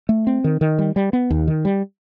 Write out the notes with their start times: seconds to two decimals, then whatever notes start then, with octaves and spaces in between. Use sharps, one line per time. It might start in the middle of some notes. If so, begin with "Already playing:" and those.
0.09 A3
0.27 C4
0.44 D#3
0.61 D#3
0.79 G3
0.96 G3
1.13 B3
1.30 D#2
1.48 D#3
1.65 G3